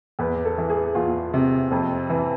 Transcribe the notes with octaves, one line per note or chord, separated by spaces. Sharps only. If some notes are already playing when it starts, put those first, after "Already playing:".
E2 B4
A4
E3
G#4
E2 F4
C3
F2
E3